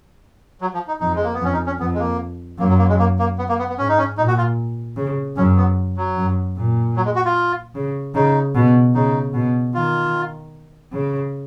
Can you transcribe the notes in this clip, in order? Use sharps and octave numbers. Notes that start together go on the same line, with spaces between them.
F#3
F3
D#4
F2 D#4
G#3
A#3
B3
F2 C#4
D#4
C#4
F2 B3
G#3
A#3
F#2 A#3
F#3
A#3
G#3
A#3
A#3
B3
A#3
B3
B3
G#2 C#4
D#4
C#4
A#2 D#4
F#4
F4
C#3
F#2 C#4
B3
F#3
F#2
A#2
F#3
G#3
F#4
F4
C#3
C#3 D#4
B2
C#3 D#4
B2
D#3 F4
C#3